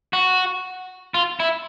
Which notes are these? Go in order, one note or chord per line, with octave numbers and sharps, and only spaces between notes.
F#4
F4
E4